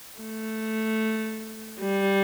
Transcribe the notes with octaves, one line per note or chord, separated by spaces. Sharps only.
A3
G3